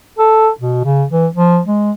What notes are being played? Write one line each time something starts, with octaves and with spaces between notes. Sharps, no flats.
A4
B2
C#3
E3
F3
G#3